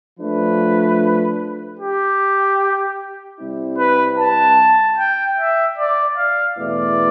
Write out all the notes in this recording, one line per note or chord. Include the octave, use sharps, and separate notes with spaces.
F3 A3 D4 B4
G4
C3 G3 C4 E4
B4
A5
G5
E5
D5
F5
E2 B2 A3 E4 B4 D5